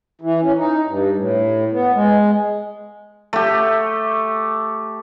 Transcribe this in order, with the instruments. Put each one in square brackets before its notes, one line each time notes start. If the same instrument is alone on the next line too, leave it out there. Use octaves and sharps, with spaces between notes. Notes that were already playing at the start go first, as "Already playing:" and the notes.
[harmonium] E3
C#4
D#4
G2
A2
B3
G#3
[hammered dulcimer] A3 G4